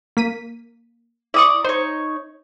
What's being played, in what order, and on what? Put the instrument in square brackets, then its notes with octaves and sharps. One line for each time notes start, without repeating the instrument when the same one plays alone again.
[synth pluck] A#3 B6 D#7
[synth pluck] E4 C#6 [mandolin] D5 D#6
[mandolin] D#4 C#5 [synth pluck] C5